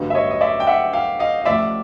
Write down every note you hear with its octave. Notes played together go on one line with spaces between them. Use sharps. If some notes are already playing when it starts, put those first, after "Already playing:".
Already playing: A1 G2 D3 F#3 B3
E5
C#5 D#5
D#5
D5 E5
G5
E5 F#5
F5 G5
D#5 F5
D#5
A1 A2 F3 D5 E5